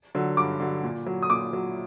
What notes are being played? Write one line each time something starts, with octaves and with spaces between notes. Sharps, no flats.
D3 F#3
G2 D6
D3 F#3
A#2
F#3
D#6
A#2 D6
F#3